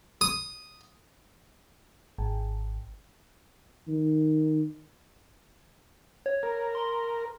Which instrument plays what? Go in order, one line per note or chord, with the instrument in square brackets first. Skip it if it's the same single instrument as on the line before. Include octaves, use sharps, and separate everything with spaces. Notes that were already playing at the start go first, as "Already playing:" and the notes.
[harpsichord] D#6
[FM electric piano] G#1
[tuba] D#3
[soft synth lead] C#5
[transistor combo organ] A#4
[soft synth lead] C6